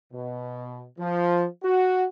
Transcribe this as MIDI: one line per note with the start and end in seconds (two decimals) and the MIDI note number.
0.12 0.84 47
0.99 1.45 53
1.64 2.04 66